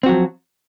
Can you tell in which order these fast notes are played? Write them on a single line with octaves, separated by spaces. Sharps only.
C4 F#4 F#3 F3